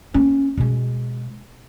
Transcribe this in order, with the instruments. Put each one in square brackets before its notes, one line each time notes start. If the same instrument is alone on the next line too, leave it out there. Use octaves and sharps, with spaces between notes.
[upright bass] A#3 C#4
B2 G#3